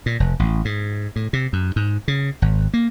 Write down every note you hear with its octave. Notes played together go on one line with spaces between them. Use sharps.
A#2
F1
A1
G#2
A2
C3
F#2
G#2
C#3
G#1
A#3